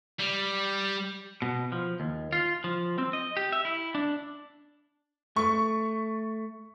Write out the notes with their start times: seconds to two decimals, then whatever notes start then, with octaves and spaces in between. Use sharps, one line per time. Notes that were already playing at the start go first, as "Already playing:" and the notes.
0.20 G3
1.42 B2
1.72 F3
2.00 D#2
2.33 F4
2.64 F3
2.98 C4
3.13 D#5
3.37 G4
3.52 E5
3.65 E4
3.95 D4
5.36 A3 C#6